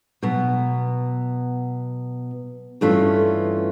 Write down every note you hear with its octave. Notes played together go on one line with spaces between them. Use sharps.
B2 F#3 B3
G2 E3 A3 C#4 F4